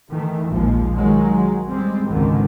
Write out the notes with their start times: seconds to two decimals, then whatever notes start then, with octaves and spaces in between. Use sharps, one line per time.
0.11 D#3 E3 A3
0.48 A#1 D#2 F3 G#3
0.95 D#3 F#3 G#3
1.66 G3 G#3 C4
2.10 G#1 C#2 G#2 D3 D#3